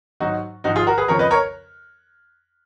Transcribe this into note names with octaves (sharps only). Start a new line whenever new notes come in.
G#2 F#3 D#4 F#4
G#2 F3 D#4 F#4
F4 G#4
F#4 A#4
G#4 B4
F2 C#3 F3 A#4 C#5
B4 D#5
A#4 C#5